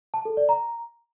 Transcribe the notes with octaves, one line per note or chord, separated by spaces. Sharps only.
A5
A4
D5
A#5